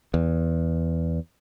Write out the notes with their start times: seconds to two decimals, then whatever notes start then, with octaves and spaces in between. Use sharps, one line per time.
0.14 E2